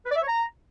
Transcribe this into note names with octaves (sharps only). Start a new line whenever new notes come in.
B4
D5
E5
C#5
A#5